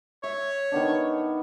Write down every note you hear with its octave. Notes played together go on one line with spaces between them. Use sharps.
C#5 E5
D#3 B3 D4